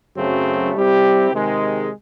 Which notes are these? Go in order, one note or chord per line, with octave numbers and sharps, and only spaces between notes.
F#2 C#3 F#3 A3 C4
G3 C4 E4 G4
C3 D#3 G#3